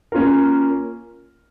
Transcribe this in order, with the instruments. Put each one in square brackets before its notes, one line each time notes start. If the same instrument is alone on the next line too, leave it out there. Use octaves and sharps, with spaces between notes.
[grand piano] A#3 C#4 F4 A#4